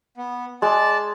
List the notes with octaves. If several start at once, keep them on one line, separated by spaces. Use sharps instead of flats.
B3
G#3 D5 A5